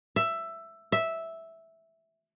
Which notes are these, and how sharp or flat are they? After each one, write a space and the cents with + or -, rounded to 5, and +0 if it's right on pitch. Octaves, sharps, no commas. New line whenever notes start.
E5 +10
E5 -5